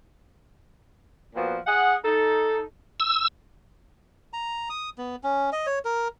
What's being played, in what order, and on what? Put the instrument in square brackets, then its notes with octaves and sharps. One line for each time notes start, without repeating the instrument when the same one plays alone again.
[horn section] A#2 F3 B3 F#4
G#4 D#5 F#5
D#4 A4
[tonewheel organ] E6
[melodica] A#5
D#6
B3
C#4
D#5
C#5
A#4